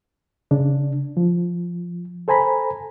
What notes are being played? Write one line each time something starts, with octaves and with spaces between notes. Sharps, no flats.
C#3 D4
F3
A4 C5 G#5 A#5 B5